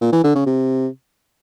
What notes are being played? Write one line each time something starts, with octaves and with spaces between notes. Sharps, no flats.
A#2
E3
D3
C#3
C3